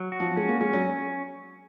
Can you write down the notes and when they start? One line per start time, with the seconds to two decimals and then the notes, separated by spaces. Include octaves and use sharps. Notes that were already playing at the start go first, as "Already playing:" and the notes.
Already playing: F#3
0.12 F#4
0.20 F3
0.36 G#3 C#4
0.49 A#3
0.61 G#3 C#4
0.73 F#3